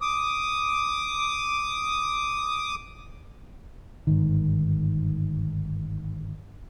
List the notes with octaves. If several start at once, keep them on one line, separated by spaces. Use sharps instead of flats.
D6 D#6
G1 G#2 D#3